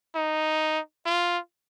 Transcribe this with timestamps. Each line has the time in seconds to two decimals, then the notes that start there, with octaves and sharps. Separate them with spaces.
0.15 D#4
1.06 F4